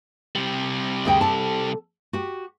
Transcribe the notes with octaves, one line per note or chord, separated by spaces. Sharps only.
C3 G3
D2 G#4 G5
A4 A5
F#4 G4